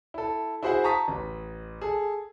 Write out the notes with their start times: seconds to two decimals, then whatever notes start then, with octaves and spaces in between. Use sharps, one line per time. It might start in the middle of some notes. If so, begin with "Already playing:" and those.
0.14 E4 A4
0.63 E4 F#4 G#4 C5 E5 F#5
0.84 A5 A#5 C#6 D#6 B6
1.08 A1
1.82 G#4 A4